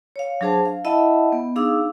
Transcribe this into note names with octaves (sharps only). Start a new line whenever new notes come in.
C#5 F5
F#3 D4 G#4 C5 A5
F5
E4 D#5 E5 F#5 A5 B5
B3
D4 D#4 G#4 F5 D6 E6